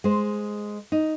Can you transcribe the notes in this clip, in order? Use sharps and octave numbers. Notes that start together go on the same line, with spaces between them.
G#3 C5
D#4